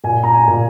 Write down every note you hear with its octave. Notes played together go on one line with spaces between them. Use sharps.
A#2 G#5
A#5
G#5
A#2